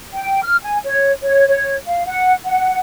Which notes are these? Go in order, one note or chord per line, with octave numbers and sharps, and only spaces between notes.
G5
F6
G#5
C#5
C#5
C#5
F5
F#5
F#5